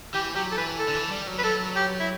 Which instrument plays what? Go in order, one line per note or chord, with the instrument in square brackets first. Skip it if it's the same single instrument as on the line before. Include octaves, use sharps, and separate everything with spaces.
[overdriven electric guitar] E3 [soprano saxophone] G4
[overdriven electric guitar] F#3 [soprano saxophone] G4
[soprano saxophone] A4
[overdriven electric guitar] E3 [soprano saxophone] B4
[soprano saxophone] A4
[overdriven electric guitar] D3
E3
G3
F#3
[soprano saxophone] B4
[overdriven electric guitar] F#3 [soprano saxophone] A4
[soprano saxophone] G4
E4